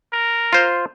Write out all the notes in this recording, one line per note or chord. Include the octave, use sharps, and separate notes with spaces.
A#4
F4 C5